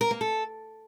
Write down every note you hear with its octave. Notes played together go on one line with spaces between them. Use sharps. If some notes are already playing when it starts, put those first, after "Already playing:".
A#4
A#3
A4